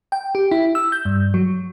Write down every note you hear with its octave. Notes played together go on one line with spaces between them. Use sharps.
G5
G4
E4
E6
G6
G2
F#3